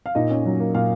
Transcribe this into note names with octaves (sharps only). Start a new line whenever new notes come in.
F5
A#2 D#4 D#5
C#4
F#3
A#3
A#2 F4 F5